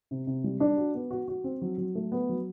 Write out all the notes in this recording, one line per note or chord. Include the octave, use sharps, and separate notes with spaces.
C3
C3
G3
D4
F#4
B3
F#4
F#4
C4
F#3
F#3
A3
B3
F#3